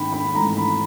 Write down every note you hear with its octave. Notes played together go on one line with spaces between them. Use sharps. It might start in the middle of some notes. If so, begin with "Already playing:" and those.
Already playing: G#2 D#3 G#3 G5 B5
B5
G#2 E3 A3 A#5
B5